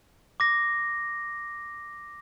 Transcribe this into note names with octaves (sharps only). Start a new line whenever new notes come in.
D6 A#6